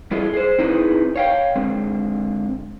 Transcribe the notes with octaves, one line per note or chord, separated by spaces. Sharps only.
G3 E4 F4 G#4 A4 D#5
G#4 C5
C4 D#4 E4 G#4 B4
C#5 F5 G5
D3 G#3 C4